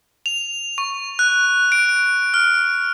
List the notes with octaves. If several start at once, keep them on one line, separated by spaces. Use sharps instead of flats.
F7
C#6
F#6
D7
F6